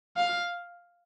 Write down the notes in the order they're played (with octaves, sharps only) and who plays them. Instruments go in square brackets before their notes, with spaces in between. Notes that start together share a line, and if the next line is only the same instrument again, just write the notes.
[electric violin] F5